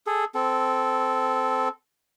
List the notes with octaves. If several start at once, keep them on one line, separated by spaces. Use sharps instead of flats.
G#4 A4
C4 A4